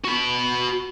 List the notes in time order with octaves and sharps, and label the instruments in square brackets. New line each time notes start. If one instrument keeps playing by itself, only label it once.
[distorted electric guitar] F#4 B5